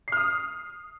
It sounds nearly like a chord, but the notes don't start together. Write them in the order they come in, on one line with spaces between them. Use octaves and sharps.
C7 F6 D#6